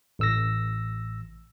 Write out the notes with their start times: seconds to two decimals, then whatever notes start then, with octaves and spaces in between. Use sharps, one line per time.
0.19 A1 E6 A#6